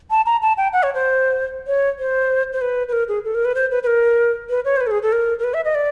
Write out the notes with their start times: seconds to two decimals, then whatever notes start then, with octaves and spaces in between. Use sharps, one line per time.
0.10 A5
0.26 A#5
0.42 A5
0.57 G5
0.73 F#5
0.83 C#5
0.94 C5
1.67 C#5
1.99 C5
2.53 C5
2.61 B4
2.88 B4
2.93 A#4
3.08 G#4
3.25 A4
3.35 A#4
3.45 B4
3.55 C5
3.71 B4
3.83 B4
3.87 A#4
4.49 B4
4.65 C#5
4.77 C5
4.81 B4
4.87 A4
4.91 G#4
5.02 A4
5.12 A#4
5.39 A#4
5.44 B4
5.54 E5
5.65 D#5
5.75 D5